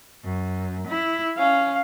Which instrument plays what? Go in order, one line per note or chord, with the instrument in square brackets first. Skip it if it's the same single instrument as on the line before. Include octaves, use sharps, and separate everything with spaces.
[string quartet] F#2
E4
[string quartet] C#4 [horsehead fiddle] F5